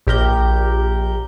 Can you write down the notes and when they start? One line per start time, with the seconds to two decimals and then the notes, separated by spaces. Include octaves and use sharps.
0.07 A#1 G4 A#4 G6